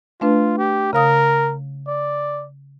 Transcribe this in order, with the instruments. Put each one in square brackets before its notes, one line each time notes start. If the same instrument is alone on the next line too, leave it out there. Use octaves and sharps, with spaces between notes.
[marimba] A3 D4 B4 [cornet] F4
[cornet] G4
[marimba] C#3 F5 D#6 [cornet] A#4
[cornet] D5